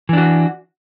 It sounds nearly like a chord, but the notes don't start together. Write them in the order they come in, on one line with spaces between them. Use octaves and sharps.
E3 D4 F#4